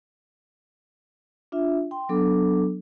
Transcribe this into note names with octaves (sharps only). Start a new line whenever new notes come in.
D4 F4 E5
G5 C6
F#3 B3 D4 A4 D6